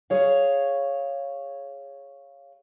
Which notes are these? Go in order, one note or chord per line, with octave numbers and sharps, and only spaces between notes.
G#4 C#5 F5